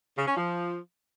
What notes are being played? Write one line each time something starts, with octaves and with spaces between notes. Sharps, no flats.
C#3
C#4
F3